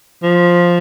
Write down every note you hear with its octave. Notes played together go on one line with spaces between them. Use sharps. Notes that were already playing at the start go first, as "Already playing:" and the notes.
F3